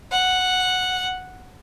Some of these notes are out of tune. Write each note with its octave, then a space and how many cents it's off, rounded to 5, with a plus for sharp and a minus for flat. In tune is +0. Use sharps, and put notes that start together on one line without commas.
F#5 -5